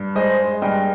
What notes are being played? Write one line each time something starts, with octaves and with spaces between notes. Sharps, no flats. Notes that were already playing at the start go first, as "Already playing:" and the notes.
Already playing: G2
G#3 C5 D#5
G2 D#5 G5